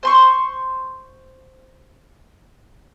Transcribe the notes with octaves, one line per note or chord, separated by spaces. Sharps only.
C5 C6 C#6